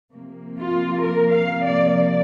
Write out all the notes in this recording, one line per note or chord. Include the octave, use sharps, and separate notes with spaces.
C3 F3 A#3
F4
A#4
F5
D5
D5